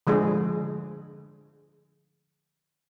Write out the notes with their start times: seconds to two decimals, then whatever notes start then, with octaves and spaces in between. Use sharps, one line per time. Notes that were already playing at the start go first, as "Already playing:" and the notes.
0.07 D3 F3 G#3 G#4